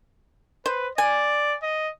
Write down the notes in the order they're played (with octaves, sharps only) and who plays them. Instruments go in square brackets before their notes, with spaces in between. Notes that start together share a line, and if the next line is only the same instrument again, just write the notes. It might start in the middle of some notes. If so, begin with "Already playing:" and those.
[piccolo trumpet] B4 [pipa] C5
[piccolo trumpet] D5 [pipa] G#5
[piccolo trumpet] D#5